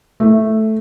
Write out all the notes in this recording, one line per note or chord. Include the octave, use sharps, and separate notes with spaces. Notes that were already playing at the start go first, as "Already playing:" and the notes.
A3